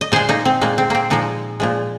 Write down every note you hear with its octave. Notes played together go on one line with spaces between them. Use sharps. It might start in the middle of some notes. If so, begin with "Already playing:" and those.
D#5
A#2 G#3 G#4 C5
A#3 D#4
C4
A#2 G#3 A#3
C4
A#3 C4
A#2 F3 G#3 A#3 D#4
A#2 F3 G#3